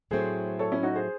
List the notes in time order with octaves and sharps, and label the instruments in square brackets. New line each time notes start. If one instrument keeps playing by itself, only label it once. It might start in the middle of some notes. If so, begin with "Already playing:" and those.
[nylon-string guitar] A2 F#3 A3 C4 [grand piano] G#4 C5
[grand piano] A4 C#5
C#4 E4
D#4 F#4
G#4 C5